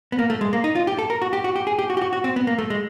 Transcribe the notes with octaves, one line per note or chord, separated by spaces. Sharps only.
B3
A#3
A3
G#3
A#3
D#4
F4
G4
A4
A#4
F#4
G4
F#4
G4
G#4
G4
F#4
G4
F#4
F#4
C4
B3
A#3
A3
G#3